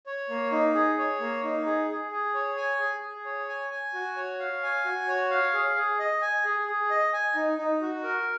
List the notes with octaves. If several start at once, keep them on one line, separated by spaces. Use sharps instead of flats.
C#5
A#3
D#4
G#4
C#5
A#3
D#4
G#4
G#4
G#4
C#5
G#5
G#4
G#4
C#5
G#5
G#5
F#4
C#5
F5
G#5
F#4
C#5
F5
G#4
G#4
D#5
G#5
G#4
G#4
D#5
G#5
D#4
D#4
F#4
A#4